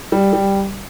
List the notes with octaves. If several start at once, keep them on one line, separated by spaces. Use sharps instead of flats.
G3
G3